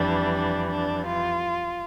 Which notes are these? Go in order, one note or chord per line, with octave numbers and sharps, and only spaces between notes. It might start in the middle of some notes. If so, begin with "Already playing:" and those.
Already playing: F2 E3 G3 D4
D4
D4
F4